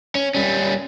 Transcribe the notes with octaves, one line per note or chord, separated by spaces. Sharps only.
C#4
G3 C#4